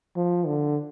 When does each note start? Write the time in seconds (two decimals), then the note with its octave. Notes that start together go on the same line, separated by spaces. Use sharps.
0.16 F3
0.46 D3